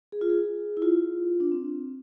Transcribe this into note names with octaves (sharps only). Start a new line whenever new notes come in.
G#4
F4
G#4
E4
F4
D4
C4